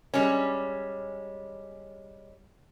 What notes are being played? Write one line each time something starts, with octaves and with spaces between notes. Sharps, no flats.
G3 G#3 C#4